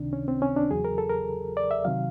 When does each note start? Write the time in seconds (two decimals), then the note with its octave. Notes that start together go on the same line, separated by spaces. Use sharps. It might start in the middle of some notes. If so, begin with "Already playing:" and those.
Already playing: C#2 C3 D#3 D4
0.13 C#4
0.28 C4
0.42 C#4
0.56 D4
0.71 E2 C#3 F#3 G#4
0.85 A#4
0.98 A4
1.09 A#4
1.57 D5
1.71 E5
1.85 C3 D#3 F#3 F5